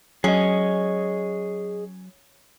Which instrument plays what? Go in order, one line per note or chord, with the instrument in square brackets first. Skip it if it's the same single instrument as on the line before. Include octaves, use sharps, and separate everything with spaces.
[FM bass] F#3 [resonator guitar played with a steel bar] C#4 [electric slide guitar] G#4 D#5